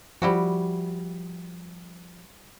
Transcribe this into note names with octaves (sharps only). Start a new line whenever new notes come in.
F3 G3 E4 F#4